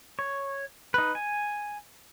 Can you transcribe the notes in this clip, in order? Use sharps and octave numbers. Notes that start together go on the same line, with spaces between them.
C#5
D#4 B4
G#5